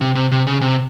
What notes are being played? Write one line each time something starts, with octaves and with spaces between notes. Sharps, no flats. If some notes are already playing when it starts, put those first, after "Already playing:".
C3
C3
C3
C#3
C3